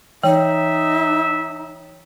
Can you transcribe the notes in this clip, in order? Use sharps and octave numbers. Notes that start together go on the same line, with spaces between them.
E3 D#4 C#5 E5 G5